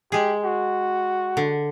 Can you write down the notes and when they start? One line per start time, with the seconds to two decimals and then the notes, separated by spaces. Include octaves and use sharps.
0.12 G#3 G4 G#4
0.44 F#4
1.37 D3